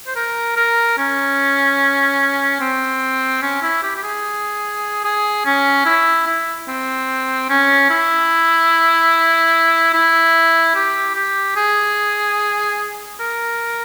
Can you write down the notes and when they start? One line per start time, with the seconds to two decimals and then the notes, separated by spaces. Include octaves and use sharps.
0.07 C5
0.16 A#4
0.57 A#4
0.98 C#4
2.61 C4
3.42 C#4
3.62 E4
3.83 G4
3.96 G4
4.03 G#4
5.04 G#4
5.46 C#4
5.86 E4
6.27 E4
6.68 C4
7.50 C#4
7.90 E4
9.94 E4
10.75 G4
11.15 G4
11.56 G#4
13.20 A#4